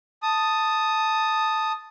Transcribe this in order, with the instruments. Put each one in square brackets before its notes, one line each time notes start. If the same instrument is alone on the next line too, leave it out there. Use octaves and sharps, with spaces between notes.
[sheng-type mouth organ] A5 D#6